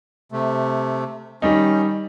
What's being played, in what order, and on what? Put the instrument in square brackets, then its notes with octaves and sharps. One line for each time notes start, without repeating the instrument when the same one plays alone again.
[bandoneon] C3 A3
[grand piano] D#3 G3 D#4 [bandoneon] C#4